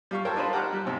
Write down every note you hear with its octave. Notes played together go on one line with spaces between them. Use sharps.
G3 F5 C#6
A4 A#4 C5 C#5 G5 A#5
D4 D#4 F4 C5 A5 B5
G4 F#5 A#5 D6 F6 F#6
G3
D#2 G#2 C3